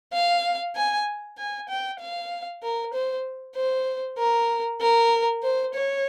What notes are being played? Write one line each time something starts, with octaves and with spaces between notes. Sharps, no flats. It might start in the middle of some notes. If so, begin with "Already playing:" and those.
F5
G#5
G#5
G5
F5
A#4
C5
C5
A#4
A#4
C5
C#5